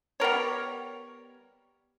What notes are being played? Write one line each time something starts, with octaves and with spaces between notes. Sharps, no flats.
G3 B3 A#4 C#5